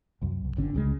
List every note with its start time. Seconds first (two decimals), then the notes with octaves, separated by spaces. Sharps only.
0.22 C2 F#2
0.45 C2
0.57 G1 D3 C#4
0.74 C#2 C#3 E3 G#3